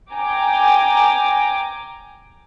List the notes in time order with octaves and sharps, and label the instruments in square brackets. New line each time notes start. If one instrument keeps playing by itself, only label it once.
[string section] G5 G#5 A#5 D6